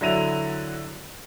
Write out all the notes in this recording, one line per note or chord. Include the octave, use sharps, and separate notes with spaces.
D3 F#3 E4 A#6 D#7 F7